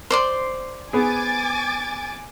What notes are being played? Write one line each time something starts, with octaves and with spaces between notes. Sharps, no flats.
C5 D5 C6
B3 G#4 G#5 D6 A6